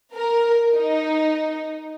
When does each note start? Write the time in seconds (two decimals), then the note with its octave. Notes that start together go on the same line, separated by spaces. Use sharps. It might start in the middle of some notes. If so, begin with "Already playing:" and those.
0.15 A#4
0.76 D#4